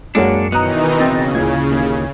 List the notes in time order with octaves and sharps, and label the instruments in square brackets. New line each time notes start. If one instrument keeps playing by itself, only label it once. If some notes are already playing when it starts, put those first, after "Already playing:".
[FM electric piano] F#2 C#5 C#7 [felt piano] G#3 A#3 F#4 [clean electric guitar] D4
[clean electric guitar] B2 [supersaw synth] D#3 E3 D#4 [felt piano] A#5 D#6 F#6
[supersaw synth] C#3 [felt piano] C4 [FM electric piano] A6 A#6
[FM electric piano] D2 G#6 [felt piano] A#2 E3
[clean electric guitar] D#2